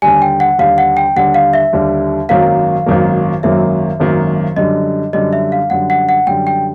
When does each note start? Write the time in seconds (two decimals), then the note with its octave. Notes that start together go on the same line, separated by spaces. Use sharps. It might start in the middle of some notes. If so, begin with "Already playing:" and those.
0.02 D#2 D3 G3 G#5
0.22 G5
0.40 F#5
0.59 D#2 D3 G3 F5
0.78 F#5
0.97 G5
1.16 D#2 D3 G3 F#5
1.34 F5
1.53 E5
1.73 D#2 D3 G3
2.29 G#1 F#2 D#3 F#3 A#3 F5
2.86 G#1 F#2 D#3 F#3 A#3
3.43 G#1 F#2 D#3 F#3 A#3 E5
4.00 G#1 F#2 D#3 F#3 A#3
4.56 F#2 D3 G3 D#5
5.13 F#2 D3 G3 D#5
5.33 E5
5.52 F5
5.70 F#2 D3 G3 F#5
5.90 F#5
6.09 F#5
6.27 F#2 D3 G3 G5
6.47 G5